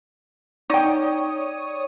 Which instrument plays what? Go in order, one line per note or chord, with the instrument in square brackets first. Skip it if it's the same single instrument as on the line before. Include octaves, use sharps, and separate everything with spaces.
[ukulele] D#4 G5 [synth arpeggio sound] C#5 D5 D#6